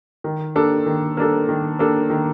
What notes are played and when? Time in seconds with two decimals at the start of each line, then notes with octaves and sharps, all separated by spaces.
0.24 D#3
0.55 A#3 D4 A4
0.86 D#3
1.17 A#3 D4 A4
1.49 D#3
1.79 A#3 D4 A4
2.10 D#3